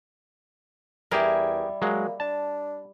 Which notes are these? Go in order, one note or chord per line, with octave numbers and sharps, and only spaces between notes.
E2 G3 E4 G4 G#4 A#4
F#3 G#3 A#3
D4 A5